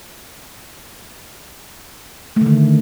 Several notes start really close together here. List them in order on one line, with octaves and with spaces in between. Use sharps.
A3 D#3 D3